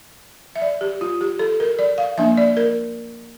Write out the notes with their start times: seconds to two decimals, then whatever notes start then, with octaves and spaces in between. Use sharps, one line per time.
0.56 E5
0.61 D5
0.81 G4
1.01 F4
1.21 G4
1.39 A4
1.60 A#4
1.79 D5
1.98 F5
2.18 F3 A#3 D4 E5
2.37 D5
2.57 A#4